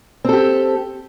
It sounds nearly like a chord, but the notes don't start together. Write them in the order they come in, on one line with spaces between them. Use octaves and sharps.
C4 A4 G4